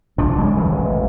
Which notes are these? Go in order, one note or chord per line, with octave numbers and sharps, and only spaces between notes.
B1 C3 F3 D4
C#3 G#3 A3 C#4
E2 D#3 E3
E1 A1